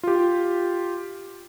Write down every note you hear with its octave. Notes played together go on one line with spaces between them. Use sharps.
F4 G4